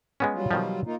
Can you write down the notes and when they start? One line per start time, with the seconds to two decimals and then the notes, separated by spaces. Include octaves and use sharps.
0.20 G#3 B3 C#4
0.34 F#3 G3 F4
0.51 B2 D#3 F3
0.86 A#3 D#4 F4